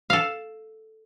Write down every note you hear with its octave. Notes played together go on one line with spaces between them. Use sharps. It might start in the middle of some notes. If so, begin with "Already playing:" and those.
A4 F5